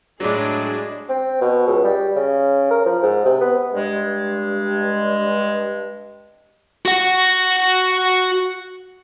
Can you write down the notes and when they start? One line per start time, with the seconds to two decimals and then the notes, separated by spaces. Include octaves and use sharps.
0.20 A2 F#3 G#3 D4 G#4
1.09 C4
1.41 B2
1.67 C#2
1.84 G3
2.16 C#3
2.71 A#4
2.86 F3
3.03 G#2
3.25 C3
3.41 B3
3.72 G2 G#3
6.86 F#4 F#5